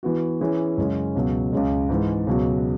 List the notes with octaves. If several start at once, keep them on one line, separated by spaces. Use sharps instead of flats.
E3 B3 F#4
E3 C#4 E4 G#4
F#2 C#3 G#3 C#4
C#2 B2 F#3
C#2 C#3 G#3
G#2 E3 G#3
C#2 B2 F#3